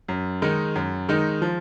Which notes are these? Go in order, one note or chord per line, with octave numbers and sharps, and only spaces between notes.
F#2
D#3 G#3 D#4
F#2
D#3 G#3 D#4
F3